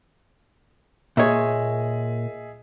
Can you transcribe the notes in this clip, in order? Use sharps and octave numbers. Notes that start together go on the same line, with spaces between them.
A#2 G#4 C#5 D#5 E5